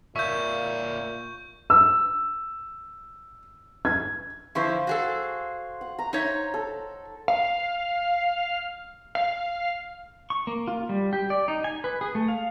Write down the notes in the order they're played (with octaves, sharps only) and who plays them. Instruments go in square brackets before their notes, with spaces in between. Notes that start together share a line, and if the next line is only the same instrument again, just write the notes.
[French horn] A#2 [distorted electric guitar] A#3 C#5 [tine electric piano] E5 [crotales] C#6 G6
[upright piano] E6
G#6
[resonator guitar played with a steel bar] D3 F3 E4 [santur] C5 F5 C#6
[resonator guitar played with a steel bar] F#4 G#4 A4
[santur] F#5
A#5
[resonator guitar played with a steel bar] D#4 C#5 E5
[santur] A4
[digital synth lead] F5
F5
[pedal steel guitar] C#6
A#3
F4
G3
G4
D5
D#4
G#5
B4
G#4
A3
F5